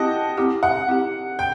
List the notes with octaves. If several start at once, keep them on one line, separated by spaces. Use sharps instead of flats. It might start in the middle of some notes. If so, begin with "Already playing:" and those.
Already playing: C4 E4 G4 D#5 F#5 G5 A5
C4 E4 G4
F#5
C4 E4 G4
G5